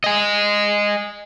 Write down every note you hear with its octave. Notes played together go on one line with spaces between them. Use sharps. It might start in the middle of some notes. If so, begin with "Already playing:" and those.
D#5 G#5